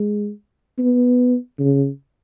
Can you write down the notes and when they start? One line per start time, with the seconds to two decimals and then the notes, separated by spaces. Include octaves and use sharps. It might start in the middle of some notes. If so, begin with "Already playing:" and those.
Already playing: G#3
0.79 B3
1.59 C#3